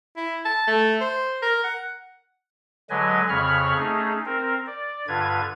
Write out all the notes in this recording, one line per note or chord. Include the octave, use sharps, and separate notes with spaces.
E4
A5
A3
C5
A#4
F#5
D3 F#3 G#3 B4 D#5 G#5
F2 C#3 C#5 B5 C#6 F6
A3 C#4 D#4 G#4
C4 A#4
D5
G2 D3 F4 B4 G#6